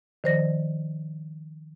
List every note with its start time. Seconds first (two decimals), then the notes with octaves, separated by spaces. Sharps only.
0.24 D#3 F3 C5 D5 A#6